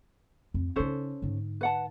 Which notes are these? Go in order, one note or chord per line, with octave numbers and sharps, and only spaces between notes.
F2
C#3 C#4 D#4 A4 C5
G#2 D3
B4 F#5 A5